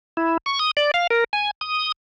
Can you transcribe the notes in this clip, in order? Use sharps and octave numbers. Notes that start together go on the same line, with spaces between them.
E4
C#6
D#6
D5
F5
A#4
G#5
D#6